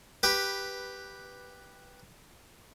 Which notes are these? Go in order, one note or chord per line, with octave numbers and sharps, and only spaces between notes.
G4 B4